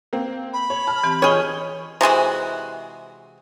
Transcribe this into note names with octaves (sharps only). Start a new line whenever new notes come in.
A#3 C4
B5
C#5
A5 F6
E3 C4 G4
F4 G#4 C#5 D#5 F6 G6 G#6
C3 E3 G#3 F#4